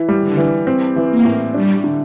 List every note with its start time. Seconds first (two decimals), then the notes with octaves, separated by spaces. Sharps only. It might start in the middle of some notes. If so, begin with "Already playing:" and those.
Already playing: E3 E4
0.09 G3
0.22 D3
0.37 E3
0.67 C4
0.96 E3
1.11 A#3
1.25 A2
1.54 G3 D4
1.84 D3